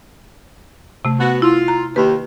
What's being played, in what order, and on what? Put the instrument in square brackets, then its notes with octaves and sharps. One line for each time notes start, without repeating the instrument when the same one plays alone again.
[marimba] C3 A3
[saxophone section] B3 F#4
[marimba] E4 [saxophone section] F4
[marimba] A#5
[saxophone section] D#2 [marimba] B4